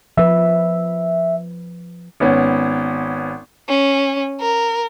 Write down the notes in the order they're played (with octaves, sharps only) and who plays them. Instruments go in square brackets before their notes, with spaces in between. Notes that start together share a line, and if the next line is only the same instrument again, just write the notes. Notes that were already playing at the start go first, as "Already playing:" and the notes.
[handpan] F3 B4 [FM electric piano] E5
[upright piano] G#1 B3 C#4
[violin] C#4
A#4